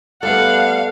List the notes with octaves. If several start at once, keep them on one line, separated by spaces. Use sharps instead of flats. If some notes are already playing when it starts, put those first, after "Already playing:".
G3 A3 B3 A4 D5 F5 F#5